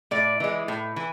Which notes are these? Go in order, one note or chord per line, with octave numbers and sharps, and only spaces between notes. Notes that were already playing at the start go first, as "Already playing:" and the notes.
A2 D5
E3 G#3
A2
E3